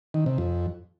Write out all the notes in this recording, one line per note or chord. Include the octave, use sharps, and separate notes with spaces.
D#3
C3
F2